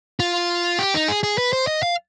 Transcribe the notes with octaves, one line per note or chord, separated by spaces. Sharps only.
F4
G4
D#4
G#4
G#4
B4
C5
D#5
F5